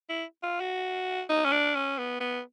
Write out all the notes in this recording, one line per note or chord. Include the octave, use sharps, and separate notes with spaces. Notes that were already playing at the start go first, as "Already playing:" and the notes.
E4
F4
F#4
D#4
C#4
D4
C#4
B3
B3